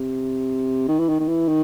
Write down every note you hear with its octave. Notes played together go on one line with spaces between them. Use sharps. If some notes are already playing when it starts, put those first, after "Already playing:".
Already playing: C3
D#3
E3
D#3
D#3
E3
D#3